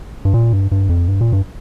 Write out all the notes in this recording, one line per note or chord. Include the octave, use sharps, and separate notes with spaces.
G2
A#2
G2
G2
F2
G2
A#2
G2